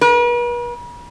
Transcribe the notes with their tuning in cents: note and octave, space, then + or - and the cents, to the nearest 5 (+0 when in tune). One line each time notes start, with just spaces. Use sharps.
B4 -45